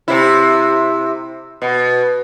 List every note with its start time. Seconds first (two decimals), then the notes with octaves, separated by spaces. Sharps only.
0.08 C3 E4
1.62 B2